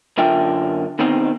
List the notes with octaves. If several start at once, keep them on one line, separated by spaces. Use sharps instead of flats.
F#2 D3 F4 A#4 E5 G5
B2 D#3 C4